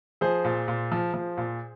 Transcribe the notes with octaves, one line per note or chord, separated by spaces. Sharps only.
F3 G#4 C5
A#2
A#2
F3
F3
A#2